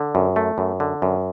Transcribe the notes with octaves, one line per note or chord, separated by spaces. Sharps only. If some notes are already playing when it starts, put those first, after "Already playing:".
Already playing: D3
F#2
A3
F#2
D3
F#2